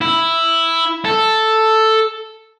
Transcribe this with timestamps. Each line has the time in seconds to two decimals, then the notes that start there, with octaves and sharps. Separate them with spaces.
0.01 E4
1.05 A4